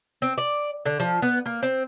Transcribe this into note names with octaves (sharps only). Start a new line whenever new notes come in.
C4
D5
D3
F3
B3
A#3
C4